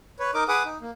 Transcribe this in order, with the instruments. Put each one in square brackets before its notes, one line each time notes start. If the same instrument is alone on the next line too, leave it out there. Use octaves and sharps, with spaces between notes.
[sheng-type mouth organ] B4 C#5
D#4 A#4 D#5 D6
G#4 B4 F#5 D6 D#6
D#4
A#3